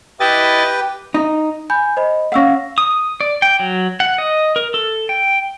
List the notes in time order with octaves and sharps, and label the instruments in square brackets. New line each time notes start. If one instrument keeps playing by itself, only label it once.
[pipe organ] E4 D#5 A6 [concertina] G4 B4 G5
[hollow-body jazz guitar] D#4
[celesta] G#5 B5 G6
C5 D#5 B5
[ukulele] C#4 F5 [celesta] F#5 E6 A#6
[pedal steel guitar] D#6
D5
G5
F#3
F#5
D#5
A#4
A4
G5